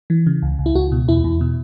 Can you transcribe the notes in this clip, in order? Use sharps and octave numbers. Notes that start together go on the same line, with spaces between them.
E3
C#3
C#2
C#2
E4
C#2 F#4
B2
E2 E4
E2
B2